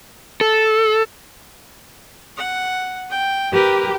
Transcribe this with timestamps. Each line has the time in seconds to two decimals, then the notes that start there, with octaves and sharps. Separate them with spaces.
0.41 A4
2.37 F#5
3.10 G5
3.53 G4 A#4 B4